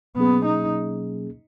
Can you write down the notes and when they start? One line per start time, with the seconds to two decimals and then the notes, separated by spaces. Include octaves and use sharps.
0.16 B2 F#3 A#3 B3 C#4 G#4
0.45 D#4